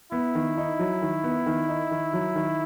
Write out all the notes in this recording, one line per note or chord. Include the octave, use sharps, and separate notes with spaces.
B3 E4
D#3
D#4
F#3
D#3
B3
D#3
D#4
D#3
F#3
D#3